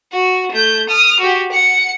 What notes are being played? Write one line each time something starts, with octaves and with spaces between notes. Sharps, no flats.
F#4
A3 G6
D#6 F6
F#4 G4
F#5 C#7